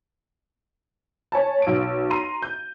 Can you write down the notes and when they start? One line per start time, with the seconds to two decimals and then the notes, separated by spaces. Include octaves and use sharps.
1.32 C#5 G#5 A5
1.62 B1 D7
2.10 A#5 C6 D#7
2.42 G6